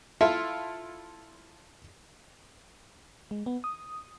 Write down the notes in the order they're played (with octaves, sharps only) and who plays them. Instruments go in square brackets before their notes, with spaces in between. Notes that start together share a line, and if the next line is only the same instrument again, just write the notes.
[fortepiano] E4 F4 A4 E5
[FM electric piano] G#3
B3
D#6